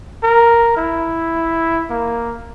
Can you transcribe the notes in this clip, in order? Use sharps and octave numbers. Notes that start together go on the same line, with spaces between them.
A#4
E4
A#3